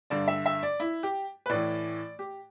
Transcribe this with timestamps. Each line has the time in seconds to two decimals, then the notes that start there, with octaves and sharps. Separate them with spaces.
0.10 G2 D3 D5
0.28 E5
0.46 E5
0.63 D5
0.80 E4
1.03 G4
1.46 B4
1.49 A2 E3 D5
2.19 G4